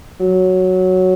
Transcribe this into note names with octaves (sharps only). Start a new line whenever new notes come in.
F#3